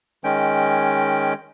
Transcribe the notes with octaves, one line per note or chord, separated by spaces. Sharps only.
D#3 G#3 C#4 G5